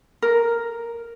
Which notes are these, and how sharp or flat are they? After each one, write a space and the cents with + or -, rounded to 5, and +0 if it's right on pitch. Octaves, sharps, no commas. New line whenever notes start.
A#4 +0